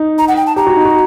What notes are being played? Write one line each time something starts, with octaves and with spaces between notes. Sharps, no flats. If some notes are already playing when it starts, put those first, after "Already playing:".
Already playing: D#4
A#5
F#5
G5
A5
G4 A#5
F#4
D#4
F#4